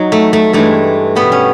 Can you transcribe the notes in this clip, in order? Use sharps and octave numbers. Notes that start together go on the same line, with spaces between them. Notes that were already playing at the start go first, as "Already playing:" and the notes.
Already playing: F#3 D#4
A3
A3
G2 E3 G#3 A3
B2 G3 B3
C#4